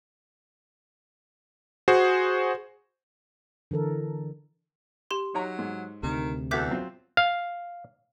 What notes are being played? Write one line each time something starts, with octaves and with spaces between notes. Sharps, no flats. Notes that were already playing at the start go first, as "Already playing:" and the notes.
F#4 G#4 C5
D3 E3 A4 A#4
G4 C6
F#3 D#4 C#5 A#5
G#2
D2 C3 D#3
E2 F#4 A4 E5 D6 G6 B6
F#3 C4 F4
F5